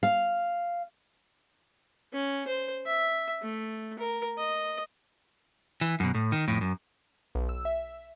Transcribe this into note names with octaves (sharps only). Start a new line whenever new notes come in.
F5
C#4
C5
E5
A3
A#4
D#5
E3
F#2 B2
A2
D#3
F2 A2
F#2
B1
E6
E5